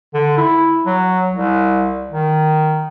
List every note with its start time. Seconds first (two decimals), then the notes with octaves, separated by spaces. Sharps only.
0.14 D3
0.37 E4
0.86 F#3
1.34 C2
2.11 D#3